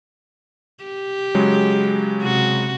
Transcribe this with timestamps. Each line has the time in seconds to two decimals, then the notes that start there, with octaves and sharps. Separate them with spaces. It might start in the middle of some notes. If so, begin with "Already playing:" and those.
0.84 G4
1.34 C#3 F#3 G#3
2.23 C3 F#4